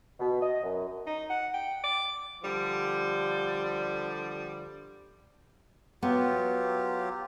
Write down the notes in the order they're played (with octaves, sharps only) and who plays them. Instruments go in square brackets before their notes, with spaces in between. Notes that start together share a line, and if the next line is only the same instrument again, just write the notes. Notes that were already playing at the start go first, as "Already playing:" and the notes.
[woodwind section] B2
D#5
F#2
[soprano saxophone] D#4
F#5
G5
D6
[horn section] D3 F3 G3
[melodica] F#3 F4 G4 [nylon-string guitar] B3